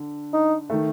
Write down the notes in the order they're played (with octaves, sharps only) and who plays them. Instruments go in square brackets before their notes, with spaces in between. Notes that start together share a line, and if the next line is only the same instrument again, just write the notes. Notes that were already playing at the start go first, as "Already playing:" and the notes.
Already playing: [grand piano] D3 D4
[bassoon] D#4
[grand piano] D#3 A3